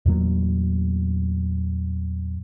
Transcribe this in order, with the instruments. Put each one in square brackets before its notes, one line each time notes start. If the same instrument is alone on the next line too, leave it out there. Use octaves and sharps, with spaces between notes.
[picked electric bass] E2 A#2 F#3